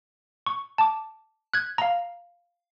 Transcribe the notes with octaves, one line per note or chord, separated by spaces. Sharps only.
C#6
A5 D6
F#6 G#6
F5 A#5